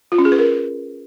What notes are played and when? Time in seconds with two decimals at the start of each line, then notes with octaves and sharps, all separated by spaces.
0.12 F4
0.18 C#4
0.25 G#4
0.32 B4
0.39 A#4